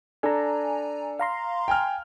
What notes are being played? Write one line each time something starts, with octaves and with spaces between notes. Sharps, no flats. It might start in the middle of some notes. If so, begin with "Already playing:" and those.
D4 A4 G#5 A#5
F5 A#5 C6
G5 G#5 F6